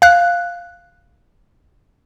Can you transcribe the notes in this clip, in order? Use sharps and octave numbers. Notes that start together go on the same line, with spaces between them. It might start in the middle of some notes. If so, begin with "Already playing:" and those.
F5 F#6